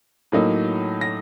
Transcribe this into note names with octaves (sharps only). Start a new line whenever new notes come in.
A2 F#3 A#3 D#4
A#6